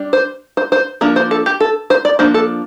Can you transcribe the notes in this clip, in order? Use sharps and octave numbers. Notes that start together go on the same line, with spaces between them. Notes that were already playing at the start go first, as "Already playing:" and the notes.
Already playing: G3 D4
C5
C5
C5
F3 A#3 D4 A#4
C5
A4
G4
A4
C5
D5
F3 A#3 D4 C5
A4